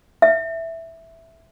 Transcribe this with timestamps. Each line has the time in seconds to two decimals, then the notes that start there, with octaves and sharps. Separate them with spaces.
0.22 E5